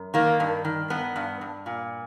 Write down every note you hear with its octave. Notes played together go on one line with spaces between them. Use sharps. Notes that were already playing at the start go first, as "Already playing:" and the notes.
Already playing: F#2
D#3 A#3
G2
D#3
G2 B3
G2
G2
A#2